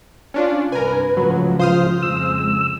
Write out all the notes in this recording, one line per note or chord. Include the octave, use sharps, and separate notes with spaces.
C#4 D4 F4
C2 G2 A#4 B4 G#5
C#2 A2 C#3 F3 F#3
F4 C5 D#6 F6
F2 G#3 E6